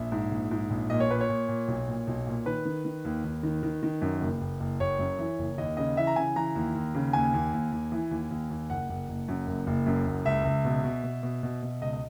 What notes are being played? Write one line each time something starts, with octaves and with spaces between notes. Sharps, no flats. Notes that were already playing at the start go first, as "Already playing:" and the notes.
Already playing: A#1 E5
G#2
A#1
G#2
A#1
A#2 D#5
C#5
A#2 B4
C#5
A#2
A#2
B1
A#2
B1
A#2
D#3 B4
D#3
D#3
D#2
D#2
D#3
D#3
D#3
F#2
F#1
F#1
F#1
F#1 C#5
F#2
E3
F#1
D#2 D#5
C#3 D#5
E3 E5
A#5
C#3 G#5
E3 A#5
D#2
D#2
C#3
D#2 G#5
D#2
D#2
D#2
E3
D#2
D#2
D#2
F#1 F#5
F#1
F#1
F#2
F#1
F#1
F#2
F#1
C#2 E5
C#2
B2
B2
B2
B2
B2
B2
C#2 D#5
D#5